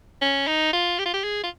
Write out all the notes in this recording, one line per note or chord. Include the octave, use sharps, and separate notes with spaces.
C#4
D#4
F4
G4
F4
G4
G#4
F4